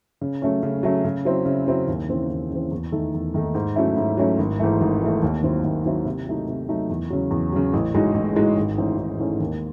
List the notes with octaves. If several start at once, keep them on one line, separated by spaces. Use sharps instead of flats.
C#3
F#3 A3 C#4
C#3
F#3 A3 C#4
C#3
F#3 C4 E4
C#3
F#3 C4 E4
D#2
C#3 E3 C4
D#2
C#3 E3 C4
E2
D#3 A3 D#4 A4
E2
D#3 A3 D#4 A4
G#2
F#3 A3 C#4 E4
G#2
F#3 A3 C#4 E4
G#1
G#2 E3 A3
G#1
G#2 E3 A3
D#2
D#3 F#3 C4 E4
D#2
D#3 F#3 C4 E4
C3
F#3 A3 D#4
C3
F#3 A3 D#4
E2
C#3 F#3
E2
C#3 F#3
A1
A2 G#3 D#4 F#4
A1
A2 G#3 D#4 F#4
G#1
G#2 E3 A3 C#4
G#1
G#2 E3 A3 C#4
D#2